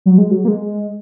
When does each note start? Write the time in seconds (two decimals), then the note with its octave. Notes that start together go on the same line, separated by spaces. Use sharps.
0.06 F#3
0.18 G#3
0.31 F#3
0.45 A#3
0.48 G#3